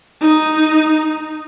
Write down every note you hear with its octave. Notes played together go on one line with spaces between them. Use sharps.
D#4